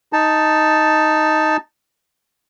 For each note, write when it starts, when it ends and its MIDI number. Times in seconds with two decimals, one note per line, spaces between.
0.13 1.57 63
0.13 1.57 81